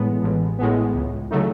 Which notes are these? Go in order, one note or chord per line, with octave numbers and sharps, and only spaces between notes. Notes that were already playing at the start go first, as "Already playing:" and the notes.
Already playing: A1 A2 G#3 B3
A1
A2 G#3 B3
C#2
C#3 F#3 A3 D#4